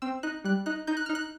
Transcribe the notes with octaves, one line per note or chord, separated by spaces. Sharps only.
C4 E6
D#4 F#6
G3 F#6
D#4 F#6
D#4 G6
F#6
D#4 F6
F#6